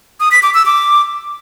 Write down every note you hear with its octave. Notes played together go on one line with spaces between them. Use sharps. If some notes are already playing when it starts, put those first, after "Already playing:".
D#6
B6
D6
E6
D6